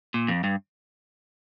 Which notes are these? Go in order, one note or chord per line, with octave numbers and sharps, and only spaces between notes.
A#2
F2
G2